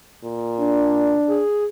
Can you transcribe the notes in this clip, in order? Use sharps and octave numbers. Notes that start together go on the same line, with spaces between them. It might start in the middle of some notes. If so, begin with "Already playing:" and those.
A#2
D4
G#4